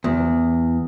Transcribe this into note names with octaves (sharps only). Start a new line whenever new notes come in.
E2